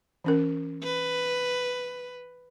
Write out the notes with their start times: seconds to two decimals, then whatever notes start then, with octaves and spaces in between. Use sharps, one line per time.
0.24 E3 C#4 A#4
0.83 B4